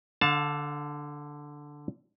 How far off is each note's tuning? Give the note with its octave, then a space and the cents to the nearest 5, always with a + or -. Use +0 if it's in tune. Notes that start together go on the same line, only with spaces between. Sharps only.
D3 +0 F5 +35 A5 +0